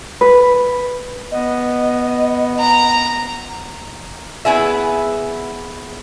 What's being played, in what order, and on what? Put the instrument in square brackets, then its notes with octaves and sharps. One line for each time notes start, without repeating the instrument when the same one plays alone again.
[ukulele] B4
[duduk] B3 [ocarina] D#5
[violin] A#5
[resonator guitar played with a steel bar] B3 E4 G#4 E5